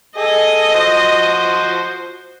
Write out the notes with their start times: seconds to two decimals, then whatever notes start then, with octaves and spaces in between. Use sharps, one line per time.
0.17 G#4 A4 D#5
0.74 F3 F#4 C5